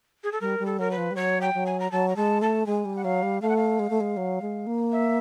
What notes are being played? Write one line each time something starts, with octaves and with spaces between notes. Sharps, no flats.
G#4
A4
G3 A#4
G3
A4
F#3 A#4
B4
F3
G3
F#3 C#5
G5
F#3
G#5
A#5
F#3 A5
A#5
G#3 A5
A3 A5
G#3 G#5
G3
F#5
F#3 F5
G3
A3 F5
F#5
F5
G#3
A3
G#3
F#3
G#3
A#3
E5